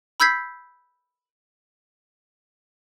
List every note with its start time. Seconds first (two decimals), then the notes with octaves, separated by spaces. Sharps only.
0.20 B5 E6 G6 G#6 B6 C7